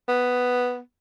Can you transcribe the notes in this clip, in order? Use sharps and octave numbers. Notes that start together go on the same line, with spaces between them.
B3